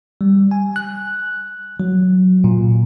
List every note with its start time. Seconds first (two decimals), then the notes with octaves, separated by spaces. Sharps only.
0.21 G3
0.51 G#5
0.76 F#6
1.80 F#3
2.44 A#2